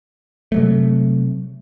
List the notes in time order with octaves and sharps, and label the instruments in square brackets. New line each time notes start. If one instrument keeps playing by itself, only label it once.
[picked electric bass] C3 F#3 A3